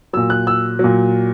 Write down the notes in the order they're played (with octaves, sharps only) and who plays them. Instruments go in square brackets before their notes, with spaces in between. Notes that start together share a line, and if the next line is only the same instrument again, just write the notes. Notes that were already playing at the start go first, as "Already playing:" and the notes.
[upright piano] A#2 F#3 E6
F#6
E6
A#2 F#3